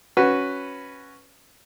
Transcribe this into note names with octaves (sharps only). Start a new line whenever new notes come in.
C#4 F#4 B4